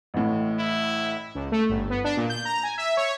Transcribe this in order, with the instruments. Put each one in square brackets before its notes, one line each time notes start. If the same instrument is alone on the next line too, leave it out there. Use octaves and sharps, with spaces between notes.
[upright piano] A1 A2
[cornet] E4
[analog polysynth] C#2
A3
G1
B3
D4
A#2
G6
A#5
G#5
E5
C#5